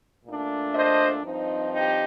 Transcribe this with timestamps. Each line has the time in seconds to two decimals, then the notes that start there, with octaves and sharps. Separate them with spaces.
0.25 A#2 A3 D4
0.75 C5 D#5
1.24 G2 F3 C4 D#4
1.73 D#4 G4